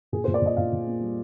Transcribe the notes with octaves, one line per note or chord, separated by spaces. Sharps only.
A#2 G#4
C5
A#2
D5
A#2 D#5
A#2 F5
A#2
A#3
G3